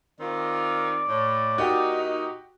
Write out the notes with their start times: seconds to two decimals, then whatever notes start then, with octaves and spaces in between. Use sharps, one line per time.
0.19 D#3 C4 F4 D5
1.07 A2
1.58 A#2 D#4 F#4 G4